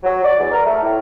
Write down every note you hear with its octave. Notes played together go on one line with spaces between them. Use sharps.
F#3
D5
E2
A#4
A3
A2